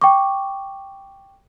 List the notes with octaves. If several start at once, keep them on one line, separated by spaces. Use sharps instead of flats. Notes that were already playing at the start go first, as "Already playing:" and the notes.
G5 C#6 D6